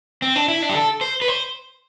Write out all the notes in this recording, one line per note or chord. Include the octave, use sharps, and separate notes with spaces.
C4
D4
E4
D4
G4
A4
C5
B4
C5